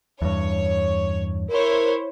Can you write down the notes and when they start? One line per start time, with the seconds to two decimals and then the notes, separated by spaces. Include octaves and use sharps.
0.22 E2 G2 C#5
1.50 E4 A#4 C5 C#5